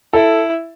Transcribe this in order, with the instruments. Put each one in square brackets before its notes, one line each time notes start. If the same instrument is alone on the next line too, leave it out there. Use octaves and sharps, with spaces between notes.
[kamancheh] E4 [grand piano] A4